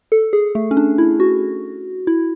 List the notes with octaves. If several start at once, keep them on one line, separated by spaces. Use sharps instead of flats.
A4
G#4
A3
C#4
D4
E4
F#4
E4